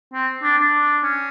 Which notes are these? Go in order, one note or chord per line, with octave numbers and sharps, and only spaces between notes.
C4
D4
D4
C#4